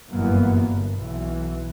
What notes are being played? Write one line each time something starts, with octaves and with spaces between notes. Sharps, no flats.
G1 F#2 A#2 E3 A#3 B3
G1
B1 E3